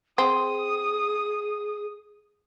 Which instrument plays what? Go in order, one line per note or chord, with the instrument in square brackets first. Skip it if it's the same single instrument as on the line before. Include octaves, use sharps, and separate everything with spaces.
[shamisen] C4 [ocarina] G#4 [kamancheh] D#6